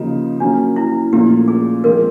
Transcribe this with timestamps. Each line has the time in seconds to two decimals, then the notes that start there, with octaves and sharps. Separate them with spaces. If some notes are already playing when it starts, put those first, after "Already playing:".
Already playing: C#3 F3 A#3 D#4 G4
0.40 F#3 A#3 C#4 D4
0.76 E4
1.12 A#2 F3 A3 C#4 G4
1.48 G#4
1.83 F3 G#3 C4 A#4